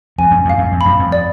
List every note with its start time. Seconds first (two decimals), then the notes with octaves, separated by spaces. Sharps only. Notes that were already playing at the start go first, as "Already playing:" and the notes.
0.18 F2 G#5
0.31 F#2
0.45 F2 F5
0.58 F#2
0.72 F2
0.81 F#2 B5
0.99 F2
1.12 D5